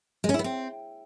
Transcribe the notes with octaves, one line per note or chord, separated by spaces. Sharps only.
G#3
C#4
E4
B3
C4